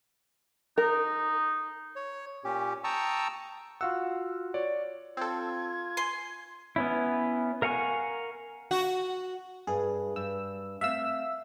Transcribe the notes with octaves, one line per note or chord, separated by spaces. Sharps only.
D#4 A#4
C#5
A#2 C#4 G4
G5 A5 A#5 C#6 D#6 E6
F4 F#4 F5 F#5 E6
C#5 D5
C4 F4 A4 G#6
G#5 C6
B3 C#4 E4
A#4 F5 F#5 G#5 C#6
F#4
G2 G#4
G2 E6
A3 C4 E5 F5 E6